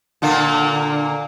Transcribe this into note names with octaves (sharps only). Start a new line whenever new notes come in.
A#2 D3 A#3